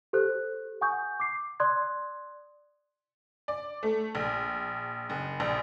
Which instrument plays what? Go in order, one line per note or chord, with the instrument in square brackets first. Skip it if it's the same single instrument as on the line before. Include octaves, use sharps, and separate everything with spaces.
[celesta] G4 A4 C5 F#6
F#5 G#5 C#6 D#6 G6
D6 C7
D5 C6 D#6 F#6 G#6
[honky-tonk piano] D5
A3
A#1
F#1
A#1